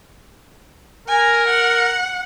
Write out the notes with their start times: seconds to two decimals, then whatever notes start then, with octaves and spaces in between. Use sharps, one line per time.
1.08 A#4 G#5
1.47 F#5